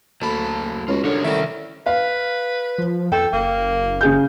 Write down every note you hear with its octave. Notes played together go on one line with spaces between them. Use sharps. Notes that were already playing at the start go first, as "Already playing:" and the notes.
D2 F#3 A#3 A5 B5
C#2 F4 F#4
C2 D3 F#4 G4 A#4 C#5
A1 C3 D#3 G3 A3 A#4 D5 E5
B4 F5
F3
F2 A4 G5
F#1 A#3
C#3 G#4 G6